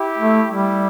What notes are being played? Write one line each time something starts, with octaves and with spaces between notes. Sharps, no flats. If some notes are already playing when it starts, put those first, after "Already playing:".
Already playing: E4 G4
A3
G3 E4